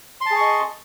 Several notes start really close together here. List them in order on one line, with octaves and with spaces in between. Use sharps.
C6 A5 G#4 C#6 D#5